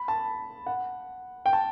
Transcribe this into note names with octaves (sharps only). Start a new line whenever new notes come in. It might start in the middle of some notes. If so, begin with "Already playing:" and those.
Already playing: B5
A5
F#5
G5
A5